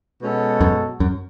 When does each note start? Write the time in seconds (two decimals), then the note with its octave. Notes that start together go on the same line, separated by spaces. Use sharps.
0.21 B2 G#3 C#4 F#4 A4
0.61 F#2
1.00 F#2